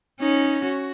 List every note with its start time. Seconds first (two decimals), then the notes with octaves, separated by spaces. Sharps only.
0.21 C#4 D#4
0.64 F#4